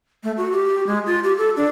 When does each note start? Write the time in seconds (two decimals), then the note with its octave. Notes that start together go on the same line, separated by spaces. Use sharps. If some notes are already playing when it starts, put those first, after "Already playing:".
0.24 A3
0.37 F#4
0.52 G4
0.87 G#3
1.06 F4
1.24 G4
1.38 A4
1.57 D4